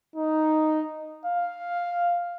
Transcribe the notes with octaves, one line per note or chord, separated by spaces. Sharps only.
D#4
F5